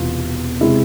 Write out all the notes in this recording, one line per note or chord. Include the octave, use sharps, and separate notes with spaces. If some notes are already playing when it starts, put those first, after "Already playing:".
Already playing: E1 E2 C3 E3 B3 F4
C3 G#3 C4 E4